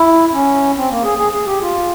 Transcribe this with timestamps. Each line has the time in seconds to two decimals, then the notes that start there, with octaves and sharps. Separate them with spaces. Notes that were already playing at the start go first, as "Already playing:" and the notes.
Already playing: E4
0.33 C#4
0.76 C4
0.90 A#3
1.04 G#4
1.18 G#4
1.33 G#4
1.46 G4
1.62 F4